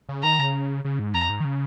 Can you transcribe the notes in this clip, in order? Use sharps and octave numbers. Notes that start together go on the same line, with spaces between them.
C#3
D#3 A#5
C#3
C#3
G#2
F2 A#5
G#2
D#3
C#3